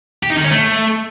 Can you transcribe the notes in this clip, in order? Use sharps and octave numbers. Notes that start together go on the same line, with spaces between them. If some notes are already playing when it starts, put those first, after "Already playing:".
G4
D#4
D#3
C#4
A3